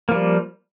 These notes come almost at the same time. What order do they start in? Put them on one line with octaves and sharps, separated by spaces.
A#3 F3 G3